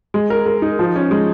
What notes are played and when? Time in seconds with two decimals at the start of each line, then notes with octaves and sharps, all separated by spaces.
0.14 G#3
0.30 A#4
0.46 A#4
0.62 D#4
0.79 F3
0.96 C#4
1.11 G#3